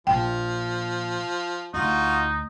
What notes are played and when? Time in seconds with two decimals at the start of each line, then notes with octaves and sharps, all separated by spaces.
0.07 A#1 F3 G5
1.74 D2 D#4 F4 F#4